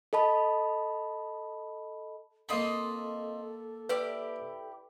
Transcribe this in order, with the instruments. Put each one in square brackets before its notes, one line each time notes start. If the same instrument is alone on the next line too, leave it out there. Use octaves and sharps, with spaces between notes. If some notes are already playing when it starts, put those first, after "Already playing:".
[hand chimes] A4 D#5 A5 B5
[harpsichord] A#3 B5 [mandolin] C4 F4 D#5 [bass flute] A4
[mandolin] E4 G4 D5 [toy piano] B4